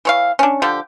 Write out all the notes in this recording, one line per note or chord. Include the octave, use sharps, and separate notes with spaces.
E3 C#5 F5
C#4 D4
D3 F3 G4